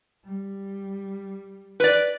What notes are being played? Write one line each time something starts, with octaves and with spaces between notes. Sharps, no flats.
G3
B4 D5